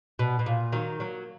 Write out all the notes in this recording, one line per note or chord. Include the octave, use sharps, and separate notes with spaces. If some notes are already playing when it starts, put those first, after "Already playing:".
B2
B2
A#2
D#3 F#3
F#3 A#3